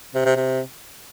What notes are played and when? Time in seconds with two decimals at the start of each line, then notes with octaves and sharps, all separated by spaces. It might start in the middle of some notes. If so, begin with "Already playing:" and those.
0.15 C3
0.25 C3
0.36 C3